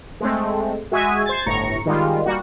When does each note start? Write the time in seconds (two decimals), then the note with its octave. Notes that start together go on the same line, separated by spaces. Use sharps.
0.20 G#3 A3 C4
0.92 G#3 F#4 G#4 E5 G#5
1.26 C5 G#6 A6
1.46 G1 A2 A#5 C#6 C#7
1.86 D#3 G3 G#3 F4
2.25 G3 A#3 F#4